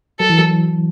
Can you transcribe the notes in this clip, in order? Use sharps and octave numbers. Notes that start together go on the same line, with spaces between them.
F#3 A4
E3
F#3